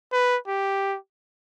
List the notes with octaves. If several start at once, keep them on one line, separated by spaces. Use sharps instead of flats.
B4
G4